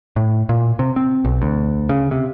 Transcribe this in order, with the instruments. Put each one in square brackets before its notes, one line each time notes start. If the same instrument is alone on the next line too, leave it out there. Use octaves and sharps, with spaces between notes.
[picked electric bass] A2
A#2
C3
C4
B1
D2
C#3
C3